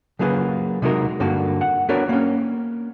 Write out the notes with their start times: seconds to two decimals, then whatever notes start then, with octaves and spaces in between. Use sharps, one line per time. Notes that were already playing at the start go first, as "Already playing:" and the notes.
0.19 C#3 F#3 A#3 F4 G#4 B4
0.82 C3 G#3 D#4 F#4 A#4
1.20 G2 D3 A#3 F#4
1.61 F#5
1.89 B3 D4 F#4 A#4 C#5 D5
2.09 A#3 C#4